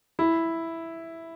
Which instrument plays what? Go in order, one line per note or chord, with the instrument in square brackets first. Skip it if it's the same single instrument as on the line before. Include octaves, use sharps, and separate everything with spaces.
[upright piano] E4